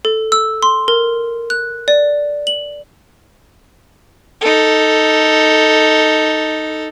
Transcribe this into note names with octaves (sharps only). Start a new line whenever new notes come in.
A4
E6
C6
A#4
F#6
D5
F#7
D#4 A4